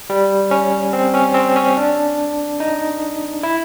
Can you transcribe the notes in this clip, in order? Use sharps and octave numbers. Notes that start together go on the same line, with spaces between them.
G3
C#4
C4
C#4
C4
C#4
D4
D#4
E4